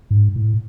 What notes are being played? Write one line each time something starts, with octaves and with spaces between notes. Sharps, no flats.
G#2
A2